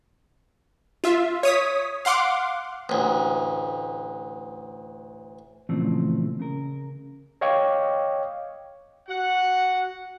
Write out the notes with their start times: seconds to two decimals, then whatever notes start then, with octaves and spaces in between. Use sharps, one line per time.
1.04 F4 E5
1.43 C#5 D#6 B6
2.05 F5 F#5 C6 D6
2.89 A1 D2
5.69 A#2 C#3 E3 F3 A3 C4
6.39 C#3 A#4
7.41 C#5 D#5 F5 G5 C#6 D6
9.09 F#4 F#5